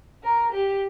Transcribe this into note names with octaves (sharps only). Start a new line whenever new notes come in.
A#4
G4